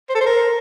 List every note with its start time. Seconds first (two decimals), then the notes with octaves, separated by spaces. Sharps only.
0.09 C5
0.15 A4
0.21 C5
0.26 A#4